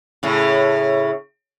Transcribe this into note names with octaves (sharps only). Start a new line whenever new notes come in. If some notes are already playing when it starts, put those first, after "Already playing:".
A2 C#3